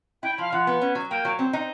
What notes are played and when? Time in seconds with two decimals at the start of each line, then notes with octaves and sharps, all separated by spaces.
0.23 E4 G5
0.38 F3 F5
0.52 F3 F#5
0.67 B3
0.81 C#4
0.95 F#3
1.10 A#3 G5
1.25 F#3
1.39 C4
1.53 D#4